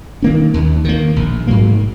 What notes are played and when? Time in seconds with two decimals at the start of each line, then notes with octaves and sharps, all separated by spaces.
0.22 D#3 A#3 C#4
0.54 D#2
0.85 D#3 A#3
1.16 A#1
1.47 G#2 F#3 A#3